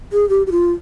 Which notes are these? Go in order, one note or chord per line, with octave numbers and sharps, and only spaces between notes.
G#4
G4
G4
F4